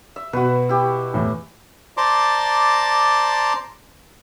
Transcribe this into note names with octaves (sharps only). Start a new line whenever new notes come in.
E5
B2 F#4 B4
E4 G4
E2 A2
C5 D5 A5 A#5 C6 D6